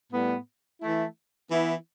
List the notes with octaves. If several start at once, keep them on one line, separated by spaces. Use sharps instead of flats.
A2 G3 B3
E3 A3 E4
E3 B3 E4